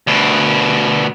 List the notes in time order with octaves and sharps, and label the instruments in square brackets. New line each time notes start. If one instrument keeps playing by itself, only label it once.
[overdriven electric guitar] D2 B2